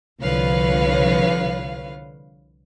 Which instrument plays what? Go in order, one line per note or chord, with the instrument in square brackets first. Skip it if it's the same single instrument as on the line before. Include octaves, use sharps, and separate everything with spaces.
[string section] C2 D3 F3 B4 C#5 F5